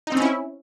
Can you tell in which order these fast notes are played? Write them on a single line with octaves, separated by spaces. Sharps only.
D#4 C4 C#4 E4